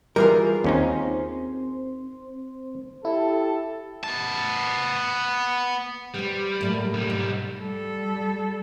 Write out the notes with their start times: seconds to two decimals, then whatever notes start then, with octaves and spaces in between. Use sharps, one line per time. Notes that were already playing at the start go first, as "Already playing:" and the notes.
0.16 E3 G3 F4 G#4 A#4
0.64 D#2 C4 C#4 D#4 C5 C6
3.05 E4 G4 A4
4.04 B3 A5
6.14 G3 B4 C5
6.61 A2 F#3 A#3
6.94 B1 G3
7.10 G#2
7.59 G3 A4